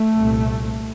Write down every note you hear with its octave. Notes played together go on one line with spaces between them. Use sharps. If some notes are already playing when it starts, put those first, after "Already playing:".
Already playing: A3
C2 A#2